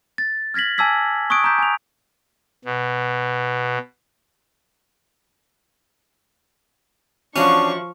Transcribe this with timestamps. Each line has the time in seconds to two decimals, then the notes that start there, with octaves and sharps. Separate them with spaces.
0.18 A6
0.54 F6 G#6 A#6 B6 F#7
0.78 G#5 A5 D6 E6 G#6 B6
1.30 C#6 D#6 F#6 G#6 D7
1.44 A#5 D6 G6 B6
1.58 G#5 F7
2.65 B2
7.36 E3 F3 C#4 D4 F#4 F5 C#6